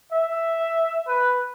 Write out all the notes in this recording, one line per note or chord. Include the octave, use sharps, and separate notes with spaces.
E5
B4